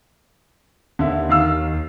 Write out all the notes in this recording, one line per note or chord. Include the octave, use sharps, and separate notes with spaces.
D#2 D3 E5
D#3 F5 E6